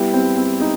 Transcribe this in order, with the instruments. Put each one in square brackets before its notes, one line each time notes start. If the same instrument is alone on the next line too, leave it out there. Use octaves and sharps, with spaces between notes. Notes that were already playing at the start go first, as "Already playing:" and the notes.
Already playing: [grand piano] G3 B3 E4 G4
[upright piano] C4
C4
D#4